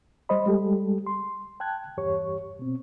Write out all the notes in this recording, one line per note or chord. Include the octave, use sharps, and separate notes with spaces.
G3 C5 D#5 B5
G3 G#3 G4 A4
C6
G5 A5 F#6 G#6
E2 G2 G4 C#5 C#6
B2 C4